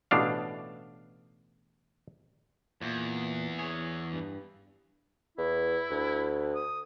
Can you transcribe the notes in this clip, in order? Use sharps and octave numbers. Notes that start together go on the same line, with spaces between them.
A1 B2 D4 F5
E2 A#2
G#4 C#5
G2
E2 E4
D2
D#6